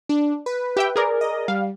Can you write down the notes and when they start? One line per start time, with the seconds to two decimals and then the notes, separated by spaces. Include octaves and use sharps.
0.09 D4
0.46 B4
0.77 G4 E5 G5
0.96 G#4 A#4 D5
1.21 D#5
1.48 G3 F5